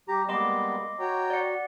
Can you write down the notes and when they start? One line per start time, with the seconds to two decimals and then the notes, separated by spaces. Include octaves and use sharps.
0.08 G3 G4 A#5
0.29 G3 G#3 A#3 B3 D#5 C6 D6
0.99 F#4 C#5 G5 A#5
1.30 D5 F#5